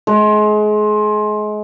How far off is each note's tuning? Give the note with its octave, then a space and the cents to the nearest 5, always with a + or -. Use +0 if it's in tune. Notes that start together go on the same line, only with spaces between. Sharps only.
G#3 +30